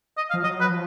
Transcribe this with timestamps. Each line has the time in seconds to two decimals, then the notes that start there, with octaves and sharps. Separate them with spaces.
0.17 D#5
0.30 F5
0.34 F3
0.43 F#3 D#5
0.60 B4
0.69 F3